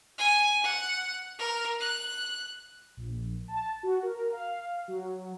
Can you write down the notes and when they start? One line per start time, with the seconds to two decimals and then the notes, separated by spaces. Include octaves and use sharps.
0.17 G#5
0.63 F#5
1.38 A#4
1.80 F#6
2.97 A#1
3.48 A5
3.83 F#4
4.03 A#4
4.33 F5
4.88 F#3